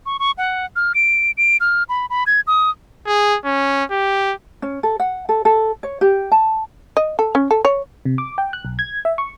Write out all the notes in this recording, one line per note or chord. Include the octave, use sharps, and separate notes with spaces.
C#6
C#6
F#5
F6
D7
D7
F6
B5
B5
G#6
D#6
G#4
C#4
G4
C#4
A4
F#5
A4
A4
C#5
G4
A5
D#5
A4
C#4
A4
C#5
C3
D6
G5
F#6
B1
G#6
E5
C#6